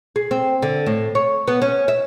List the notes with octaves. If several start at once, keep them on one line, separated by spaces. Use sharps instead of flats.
G#4
C4
D3
A2
C#5
B3
C#4
E5